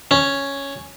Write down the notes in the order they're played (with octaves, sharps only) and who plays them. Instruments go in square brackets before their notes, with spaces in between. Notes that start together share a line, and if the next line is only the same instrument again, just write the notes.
[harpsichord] C#4